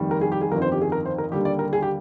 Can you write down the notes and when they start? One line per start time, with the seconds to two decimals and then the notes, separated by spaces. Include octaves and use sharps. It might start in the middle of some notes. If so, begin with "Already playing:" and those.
Already playing: F1 D#2 D#3 G3
0.11 A#4
0.21 G#4
0.32 G4
0.41 G#4
0.52 G1 F2 D#3 A#4
0.62 C5
0.72 G4
0.82 G#4
0.92 A#4
1.05 C5
1.18 A#4
1.32 D#2 D3 G3 G4
1.45 D5
1.59 A#4
1.73 G#4
1.82 G4